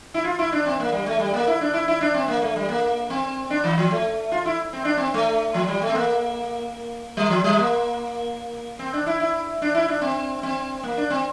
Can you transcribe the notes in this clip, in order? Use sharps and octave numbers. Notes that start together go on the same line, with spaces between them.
E4
F4
E4
D4
C4
A#3
G3
A3
G3
A#3
E4
D4
E4
E4
D4
C4
A#3
A3
G3
A#3
C4
D4
E3
F3
A3
F4
E4
C4
D4
C4
A3
F3
G3
A3
C4
A#3
G3
F3
G3
A#3
C4
D4
E4
E4
D4
E4
D4
C4
C4
A#3
D4
C4